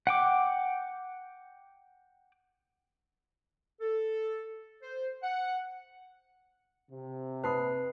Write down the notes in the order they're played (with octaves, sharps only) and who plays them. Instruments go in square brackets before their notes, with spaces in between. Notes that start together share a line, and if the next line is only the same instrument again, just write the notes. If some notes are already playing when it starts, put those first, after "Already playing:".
[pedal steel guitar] F#5 G5 D6
[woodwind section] A4
C5
F#5
[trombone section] C3
[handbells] B4 C7 [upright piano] A5 B5 D#6